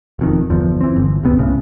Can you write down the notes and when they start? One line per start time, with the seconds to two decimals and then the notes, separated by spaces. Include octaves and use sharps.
0.19 E1 F2 D#3
0.50 G1 E2 F3
0.81 E3 C4
0.96 G1
1.23 D1 C#2 C3 B3
1.39 C2 A2 C#3